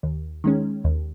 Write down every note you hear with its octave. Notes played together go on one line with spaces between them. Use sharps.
D#2
D#3 G#3 C#4
D#2